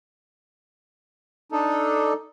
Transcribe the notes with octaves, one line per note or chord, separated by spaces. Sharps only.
D4 D#4 A4